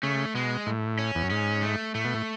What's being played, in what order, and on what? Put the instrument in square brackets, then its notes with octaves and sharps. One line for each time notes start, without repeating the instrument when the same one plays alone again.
[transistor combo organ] C#3 [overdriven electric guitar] A3
[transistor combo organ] B2 [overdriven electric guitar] G#3
[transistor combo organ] A2
[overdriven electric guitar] C#4
[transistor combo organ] E2
F#2
[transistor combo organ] G#2 [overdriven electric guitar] C#4
[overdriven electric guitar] A3
[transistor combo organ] A2 [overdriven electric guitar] A3
[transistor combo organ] B2
A2